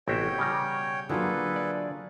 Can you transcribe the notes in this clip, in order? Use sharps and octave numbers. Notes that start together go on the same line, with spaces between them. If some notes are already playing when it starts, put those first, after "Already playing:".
A1 B2 C4 F#4 C#5 E5 G5 A#6
C#3 G3 A#5
D3 F#3 A#3 F4 F#4 G#4 A4 B4
D5 E5